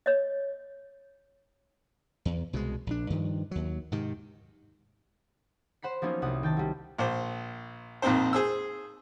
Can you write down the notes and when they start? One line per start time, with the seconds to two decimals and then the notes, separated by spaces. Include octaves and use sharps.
0.06 C#5 D#5
2.25 E2
2.53 C2 B2 G3 G#3
2.87 A#1 D4
3.10 G2 D#3 F3
3.51 D#2 F#3
3.92 G#2 C3 D#3
5.82 C5 F#5 B5 C7
6.02 F3 F#3 A#3 B3 C#4 D#4
6.22 C2 F#5 D#6
6.43 D#3 G5 A5
6.57 F#3 G3
6.98 A#1 C5
8.02 A#1 F2 C4 D#4 C5
8.33 G#4 C5 E6